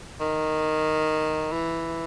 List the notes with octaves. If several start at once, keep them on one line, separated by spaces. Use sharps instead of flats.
D#3
E3